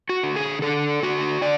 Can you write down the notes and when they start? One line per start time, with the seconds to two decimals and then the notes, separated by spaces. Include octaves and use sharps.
0.09 F#4
0.23 D3
0.36 G#4
0.62 D3 A4
1.03 D3 F#4
1.41 D3 D5